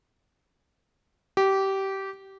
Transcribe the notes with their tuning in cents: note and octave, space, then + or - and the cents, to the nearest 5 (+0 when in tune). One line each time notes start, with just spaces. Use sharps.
G4 -20